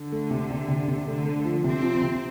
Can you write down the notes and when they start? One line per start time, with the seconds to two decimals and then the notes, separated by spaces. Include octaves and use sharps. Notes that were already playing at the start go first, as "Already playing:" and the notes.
Already playing: D3
0.12 A3
0.31 C3
0.50 C3
0.68 C3
0.88 C3
1.07 D3 A3
1.26 A3
1.45 F3
1.64 C3 C4
1.83 F3
2.01 C3